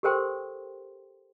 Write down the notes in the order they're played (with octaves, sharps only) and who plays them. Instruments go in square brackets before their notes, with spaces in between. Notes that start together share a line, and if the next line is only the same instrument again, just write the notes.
[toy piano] G4 A4 A#4 C5 G5 C6